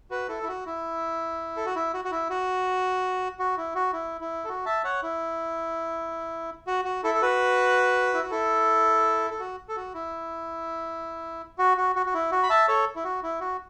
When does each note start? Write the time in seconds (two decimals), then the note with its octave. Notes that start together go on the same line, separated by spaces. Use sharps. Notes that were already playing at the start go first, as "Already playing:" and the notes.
0.11 F#4 B4
0.29 E4 A4
0.43 E4
0.48 F#4
0.66 E4
1.57 A4
1.66 F#4
1.75 E4
1.94 F#4
2.05 F#4
2.12 E4
2.30 F#4
3.39 F#4
3.57 E4
3.75 F#4
3.93 E4
4.21 E4
4.44 A4
4.49 F#4
4.66 E5 A5
4.84 C#5 F#5
5.03 E4
6.67 F#4
6.85 F#4
7.04 E4 A4
7.14 A4
7.22 F#4 B4
8.14 E4
8.23 F#4
8.31 E4 A4
9.31 A4
9.40 F#4
9.69 A4
9.76 F#4
9.94 E4
11.58 F#4
11.77 F#4
11.96 F#4
12.06 F#4
12.14 E4
12.31 F#4
12.43 B5
12.50 E5 A5
12.68 A4 C#5
12.96 E4
13.04 F#4
13.23 E4
13.41 F#4